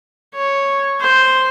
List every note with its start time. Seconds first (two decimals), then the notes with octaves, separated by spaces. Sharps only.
0.35 C#5
1.00 C5